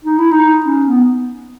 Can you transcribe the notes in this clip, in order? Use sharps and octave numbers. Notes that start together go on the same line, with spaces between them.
D#4
E4
D#4
C#4
B3